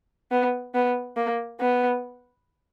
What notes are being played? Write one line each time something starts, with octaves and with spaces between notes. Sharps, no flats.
B3
B3
A#3
B3